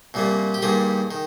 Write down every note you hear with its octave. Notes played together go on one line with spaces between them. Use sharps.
C2 A#2 G3 A#3
G4
G2 D#3 G3 A#3 G#4
D#3